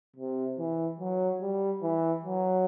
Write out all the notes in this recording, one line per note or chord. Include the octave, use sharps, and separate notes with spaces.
C3
E3
F#3
G3
E3
F#3